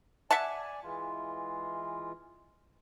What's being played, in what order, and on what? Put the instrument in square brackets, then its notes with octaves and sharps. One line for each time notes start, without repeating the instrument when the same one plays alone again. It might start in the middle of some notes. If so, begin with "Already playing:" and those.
[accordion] D5 G#5 [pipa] E5 F#5 A5
[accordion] E3 G#3 F4